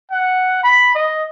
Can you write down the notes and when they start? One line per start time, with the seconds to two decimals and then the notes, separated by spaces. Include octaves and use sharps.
0.11 F#5
0.64 B5
0.95 D#5